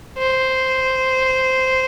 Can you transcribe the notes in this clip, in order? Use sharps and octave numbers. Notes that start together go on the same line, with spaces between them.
C5